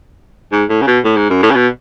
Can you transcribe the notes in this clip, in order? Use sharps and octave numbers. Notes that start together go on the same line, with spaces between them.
G#2
A2
C#3
B2
A2
G#2
F#2
A2
C#3
B2